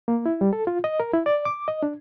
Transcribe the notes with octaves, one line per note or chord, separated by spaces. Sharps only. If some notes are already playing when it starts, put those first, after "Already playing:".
A#3
E4
G3
A4
F4
D#5
A#4
E4
D5
D6
D#5
D4